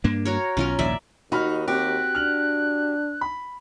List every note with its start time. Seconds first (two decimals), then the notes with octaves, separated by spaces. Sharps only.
0.04 G2 A#3 D4
0.25 F#4 A#4 C#5
0.57 B1 C#4 F4 A#4
0.79 A#1 D#2 G#2 D5 E5
1.32 D#2 D#4 F#4 B5 F6
1.68 C4 F#4 G4 F#6
2.15 D4 F6 F#7
3.21 B5